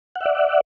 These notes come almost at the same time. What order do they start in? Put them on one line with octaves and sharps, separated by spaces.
F#5 E5 D5